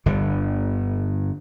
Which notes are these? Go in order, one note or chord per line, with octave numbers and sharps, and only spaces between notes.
G1 G2 D3